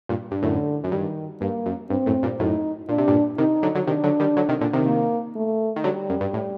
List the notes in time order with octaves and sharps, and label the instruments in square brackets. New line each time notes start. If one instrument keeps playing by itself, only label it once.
[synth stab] G2 A#2
G2
[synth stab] F#2 A2 [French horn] D3
[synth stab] F#2
[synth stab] G2 [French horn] D#3
[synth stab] G2 [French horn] A#3
[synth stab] F#2
[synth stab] G2 [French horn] C4
[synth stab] F#2 A2
G2 A#2
[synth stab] F#2 A2 [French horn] D#4
[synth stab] A#2 [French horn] D4
[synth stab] C3
G2 A#2
[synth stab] C3 D#3 [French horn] D#4
[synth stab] D3 F#3
D3 F#3
[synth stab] C3 D#3 [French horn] D4
[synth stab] D3 F#3
D#3 G3
D3 F#3
C3 D#3
A#2 D3
C3 D#3
[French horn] A#3
A3
[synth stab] D#3
[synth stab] D3 F#3 [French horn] G3
[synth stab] F#2
G2
A2